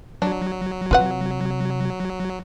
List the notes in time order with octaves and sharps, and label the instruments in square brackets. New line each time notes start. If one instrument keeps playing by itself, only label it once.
[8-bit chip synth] F#3 [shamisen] D4
[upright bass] C3 [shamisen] F4 B4 F#5